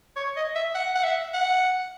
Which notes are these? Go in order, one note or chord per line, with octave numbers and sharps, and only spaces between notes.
C#5
D#5
E5
F#5
F#5
E5
F#5